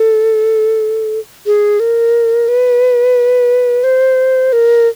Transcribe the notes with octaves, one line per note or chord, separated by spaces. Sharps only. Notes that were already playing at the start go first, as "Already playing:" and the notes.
Already playing: A4
G#4
A#4
B4
C5
A#4